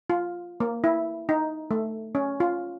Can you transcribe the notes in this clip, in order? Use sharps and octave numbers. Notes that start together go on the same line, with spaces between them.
F4
A#3
E4
D#4
A3
C#4
F4